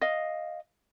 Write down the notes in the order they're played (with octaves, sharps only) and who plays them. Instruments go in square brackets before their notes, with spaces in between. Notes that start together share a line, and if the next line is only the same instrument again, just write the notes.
[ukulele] D#5 F5